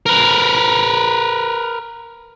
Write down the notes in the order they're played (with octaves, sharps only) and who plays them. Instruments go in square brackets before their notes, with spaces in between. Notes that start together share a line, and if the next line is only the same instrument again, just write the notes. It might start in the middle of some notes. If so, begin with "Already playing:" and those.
[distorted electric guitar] A#4 B4